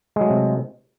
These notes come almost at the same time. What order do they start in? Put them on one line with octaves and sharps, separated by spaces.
G#3 F#3 A3 C3